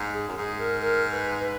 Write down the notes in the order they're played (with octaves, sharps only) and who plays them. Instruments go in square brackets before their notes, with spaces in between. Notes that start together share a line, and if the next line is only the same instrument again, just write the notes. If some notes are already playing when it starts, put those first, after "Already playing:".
Already playing: [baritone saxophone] G#2
[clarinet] G#4
[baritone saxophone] F#2
[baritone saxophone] G#2 [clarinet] G#4
[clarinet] A#4
A#4
B4
B4